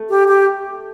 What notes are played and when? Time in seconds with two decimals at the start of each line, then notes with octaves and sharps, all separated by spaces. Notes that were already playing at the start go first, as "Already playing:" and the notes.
Already playing: A3
0.09 G4
0.28 G4